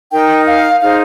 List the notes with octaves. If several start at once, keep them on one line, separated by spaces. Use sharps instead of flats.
D#4 A#4 G5
F5
D#4 G#4 C5 F5